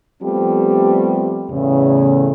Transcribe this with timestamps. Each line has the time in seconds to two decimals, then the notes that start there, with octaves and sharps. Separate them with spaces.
0.23 F3 G3 A3 B3 C4 G4
1.50 E2 A2 C#3